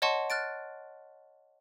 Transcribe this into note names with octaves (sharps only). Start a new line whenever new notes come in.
C#5 D#5 F#5 A5 C6 C#6
F6 F#6 A6 D7